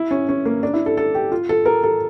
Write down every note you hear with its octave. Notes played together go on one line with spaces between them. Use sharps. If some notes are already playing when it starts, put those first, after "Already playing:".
Already playing: E4
C#4
C#4
A#3
D4
E4
A4
A4
G4
F4
A4
A#4
A4